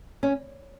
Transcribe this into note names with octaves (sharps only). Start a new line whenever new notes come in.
C#4